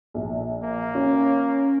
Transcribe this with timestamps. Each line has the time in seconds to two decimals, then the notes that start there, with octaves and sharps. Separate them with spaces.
0.14 A#1
0.64 A#3
0.95 C#4